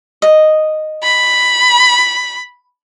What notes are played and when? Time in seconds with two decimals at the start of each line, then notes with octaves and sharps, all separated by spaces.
0.22 D#5
1.03 B5